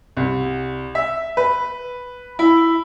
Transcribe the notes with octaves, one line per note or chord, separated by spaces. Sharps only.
C2
E5
B4
E4